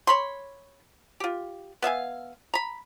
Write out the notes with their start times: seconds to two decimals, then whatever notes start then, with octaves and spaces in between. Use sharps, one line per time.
0.07 C#5 B5 C6
1.20 F4 G4
1.82 B3 E5 F5 G#5
2.54 A#5 B5